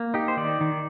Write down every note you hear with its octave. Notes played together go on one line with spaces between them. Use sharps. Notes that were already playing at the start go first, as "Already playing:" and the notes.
Already playing: A#3
D#4 G4
C5
D#3 D5
D#3